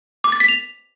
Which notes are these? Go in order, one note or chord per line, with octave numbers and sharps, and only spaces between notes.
D6
A6
B6
F7